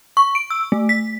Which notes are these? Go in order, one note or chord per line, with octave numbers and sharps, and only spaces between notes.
C#6
D7
E6
A3
B6